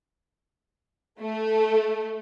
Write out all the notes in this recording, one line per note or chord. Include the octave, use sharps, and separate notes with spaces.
A3